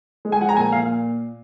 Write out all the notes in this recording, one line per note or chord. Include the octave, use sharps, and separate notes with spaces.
G#3
G#5
F3 F#5
A#5
A#2 G#5
A#2 F5